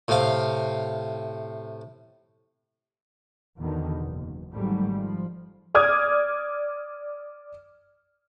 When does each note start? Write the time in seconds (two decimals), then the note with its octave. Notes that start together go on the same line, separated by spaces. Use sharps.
0.08 A2 C3 F5
3.57 E2 B2 D3 D#3
4.04 F#1
4.53 G#1 G#2 F#3 G3 A3
4.96 F3
5.75 D5 D6 D#6 F6 G#6